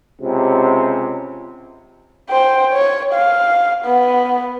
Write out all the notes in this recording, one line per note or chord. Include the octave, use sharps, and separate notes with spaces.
C#2 C3
C5 G5
C#5
F5
B3